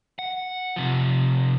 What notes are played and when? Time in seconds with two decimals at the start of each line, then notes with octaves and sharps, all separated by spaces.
0.19 F#5
0.76 C3 F3